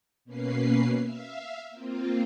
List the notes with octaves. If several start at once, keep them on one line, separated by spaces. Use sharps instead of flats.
B2 A#3 C#4 B4 C7
E5 F5
A#3 C4 F4